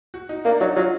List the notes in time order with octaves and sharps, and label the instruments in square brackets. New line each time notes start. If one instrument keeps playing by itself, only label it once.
[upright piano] F#4
D#4
[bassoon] A#3 [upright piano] D4
[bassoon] F#3 [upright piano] D#4
[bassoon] F#3 [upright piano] F4